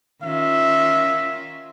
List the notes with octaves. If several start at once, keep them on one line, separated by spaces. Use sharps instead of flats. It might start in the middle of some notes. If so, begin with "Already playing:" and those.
D#3 C#4 F4 E5